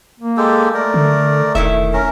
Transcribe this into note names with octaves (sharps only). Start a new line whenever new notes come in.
A#3
G#3 G4 A4
A3 A#4 D5
D3
E1 D#3 E4 E5
C#4 A#4